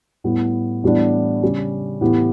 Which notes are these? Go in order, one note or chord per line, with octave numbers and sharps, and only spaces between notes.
A2 G3 B3
A2 E3 G3 B3 D4
C#3 G3 C#4
A2 E3 B3 E4 G4